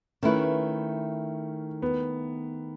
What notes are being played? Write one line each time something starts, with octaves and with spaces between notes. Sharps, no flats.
D#3 A3 C#4 E4 B4
B3